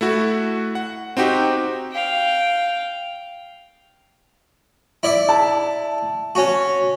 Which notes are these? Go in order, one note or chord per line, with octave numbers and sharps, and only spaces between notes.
A3 E4 F#4
F#5
C4 D#4 F#4 G4
F5 G5
E4 D5 E5
A5
C#4 F#4